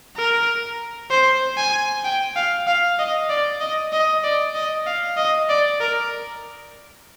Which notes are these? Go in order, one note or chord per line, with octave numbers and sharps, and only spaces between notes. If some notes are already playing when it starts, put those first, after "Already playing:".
A#4
C5
G#5
G5
F5
F5
D#5
D5
D#5
D#5
D5
D#5
F5
D#5
D5
A#4